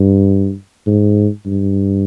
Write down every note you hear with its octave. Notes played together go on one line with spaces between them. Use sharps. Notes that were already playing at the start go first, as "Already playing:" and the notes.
Already playing: G2
G#2
G2